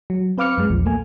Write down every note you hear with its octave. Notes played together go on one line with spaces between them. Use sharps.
F#3
C4 B4 F5 D6 F6 C#7
F#2 G#3
A#1 E2 F3
A3 A#3 G#5